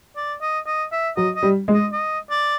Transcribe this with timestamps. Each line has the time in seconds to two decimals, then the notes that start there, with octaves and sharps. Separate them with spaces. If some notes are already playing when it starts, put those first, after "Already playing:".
0.17 D5
0.42 D#5
0.67 D#5
0.92 E5
1.17 F#3 D#5
1.36 D#5
1.43 G3
1.68 G#3
1.74 D#5
1.93 D#5
2.31 D5